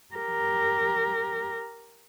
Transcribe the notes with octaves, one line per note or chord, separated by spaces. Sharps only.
G4 A#4